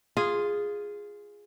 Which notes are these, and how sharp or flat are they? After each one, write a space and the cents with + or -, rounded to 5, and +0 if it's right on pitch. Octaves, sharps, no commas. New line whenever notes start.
F4 +0 G#4 -5